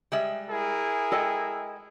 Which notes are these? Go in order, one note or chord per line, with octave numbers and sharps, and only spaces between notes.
G3 G#3 E5
E4 G#4 A#4
G#3 A4 D#5 G5